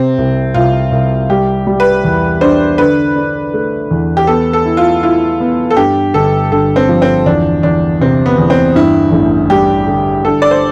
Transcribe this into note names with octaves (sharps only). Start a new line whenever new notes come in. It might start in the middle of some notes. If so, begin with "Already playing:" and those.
Already playing: C3 C4
C2
C2 F4
C2
G3 G4
G3
B4
E2
D4 C5
D3 B4
D4
A3
E2
G4
B3 A4
A4
E4
F4
E4 F4
B3
A4
G2 G4
G1 A4
G1 A4
C4
F3
C4
E2 D4
E2 D4
C3 C4
B3
E2
C4
G2 E4
A1
G3 G4
D3
D3 A4
D5
C5